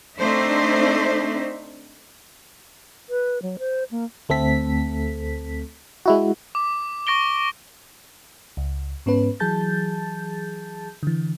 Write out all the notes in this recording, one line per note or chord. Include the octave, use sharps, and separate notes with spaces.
A3 C4 D4 D#4 C5 E5
B4
F#3
C5
A#3
D2 A3 C4 A4 B6
G#3 E4 F#4
D6
C#6 A#6 D7 G7
C#2
G#2 B3 C#4 B4
E3 F#3 G#4 A5 G6 A6
D3 E3